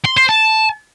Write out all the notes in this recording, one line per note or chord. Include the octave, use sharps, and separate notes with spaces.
C6
C5
A5